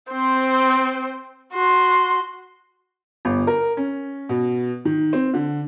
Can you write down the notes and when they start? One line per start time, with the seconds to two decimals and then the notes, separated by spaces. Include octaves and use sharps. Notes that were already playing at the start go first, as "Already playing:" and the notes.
0.11 C4 C5
1.53 F#4 C6
3.25 G1
3.47 A#4
3.77 C#4
4.29 B2
4.85 D#3
5.13 C4
5.34 D3